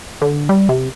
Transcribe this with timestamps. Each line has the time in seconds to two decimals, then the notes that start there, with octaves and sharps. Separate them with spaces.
0.22 D3
0.49 G3
0.69 C3